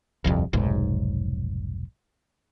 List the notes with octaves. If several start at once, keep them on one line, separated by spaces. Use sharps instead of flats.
D#1 C2 F2
F1 B1 G#2